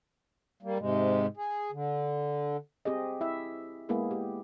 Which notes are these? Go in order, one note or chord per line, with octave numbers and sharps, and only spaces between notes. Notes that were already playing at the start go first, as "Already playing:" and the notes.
G3 A#3
G#2 C3 G#3
G#4
D3
C4 G4 G#4 D#5
E4 E5
G#3 A#3 B3 E4 G#4
G4